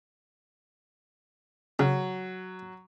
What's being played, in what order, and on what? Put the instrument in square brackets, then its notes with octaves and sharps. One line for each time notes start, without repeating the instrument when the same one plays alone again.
[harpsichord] C#3 [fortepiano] F#3